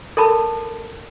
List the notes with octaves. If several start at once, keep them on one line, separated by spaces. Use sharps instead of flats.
A4 A#4 A5 B5